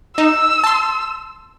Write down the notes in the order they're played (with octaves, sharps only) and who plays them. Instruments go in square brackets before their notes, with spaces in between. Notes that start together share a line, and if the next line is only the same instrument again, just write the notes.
[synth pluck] D#4 [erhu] E6
[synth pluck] A5 C6